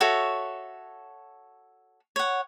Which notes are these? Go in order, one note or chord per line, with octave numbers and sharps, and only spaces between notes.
F#4 A4 C#5 E5
C#5 F#5